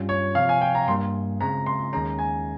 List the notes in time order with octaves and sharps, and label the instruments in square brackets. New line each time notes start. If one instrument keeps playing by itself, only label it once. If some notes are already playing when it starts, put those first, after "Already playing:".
Already playing: [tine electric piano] G2 G3 C#4 F4
[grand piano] C#5
[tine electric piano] C3 F3 C4 [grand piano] F5
[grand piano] G#5
G5
A#5
[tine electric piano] G2 G3 A#3 [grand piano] C6
[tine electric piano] C#3 G#3 C4 [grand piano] A#5
[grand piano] C6
[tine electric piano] D#2 D#3 G#3 C#4 [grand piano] A#5
[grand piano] G#5